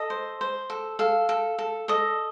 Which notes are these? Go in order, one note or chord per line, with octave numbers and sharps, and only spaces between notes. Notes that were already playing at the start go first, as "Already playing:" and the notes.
Already playing: A4 D#5
C5
C5
A4
A4 F5
A4
A4
A4 D#5